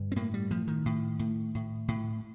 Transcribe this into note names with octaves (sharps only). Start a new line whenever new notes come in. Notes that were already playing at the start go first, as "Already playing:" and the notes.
Already playing: G2 D3
C4
A2 A#3
G3
A2 F3
D#3
A2
A2
A2
A2